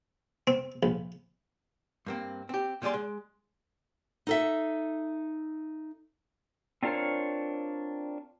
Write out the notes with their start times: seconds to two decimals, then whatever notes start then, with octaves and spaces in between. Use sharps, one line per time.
0.47 C4
0.83 A#1
2.07 G2 A#3 C4
2.49 C4 G4
2.82 A#2 G3 G#4 D5 C6
2.94 G#3
4.27 D#4 A4 E5
6.83 C4 D4 F4 A#4 C5 C#5